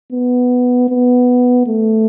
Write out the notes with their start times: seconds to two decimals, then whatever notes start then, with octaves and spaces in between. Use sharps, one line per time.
0.12 B3
0.89 B3
1.67 A3